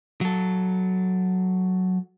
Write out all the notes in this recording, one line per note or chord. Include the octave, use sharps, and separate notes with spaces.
F#3 A4